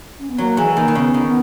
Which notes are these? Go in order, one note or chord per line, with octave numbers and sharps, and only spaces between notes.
C#4
B3
F#3 A#3
E3 G#3
G#3
D#3 A#3
D#3
C#3 B3
D#3
B3